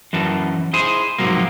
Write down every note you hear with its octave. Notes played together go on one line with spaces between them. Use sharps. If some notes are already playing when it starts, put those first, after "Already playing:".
F#2 E3 A#4 A5
E4 G#4 C5
G#2 C3 D#3 F3 F#3 A#3